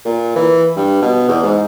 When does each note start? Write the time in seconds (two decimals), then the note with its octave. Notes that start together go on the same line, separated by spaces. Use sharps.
0.05 A#2
0.35 E3
0.76 G2
1.02 B2
1.28 E2
1.43 G#2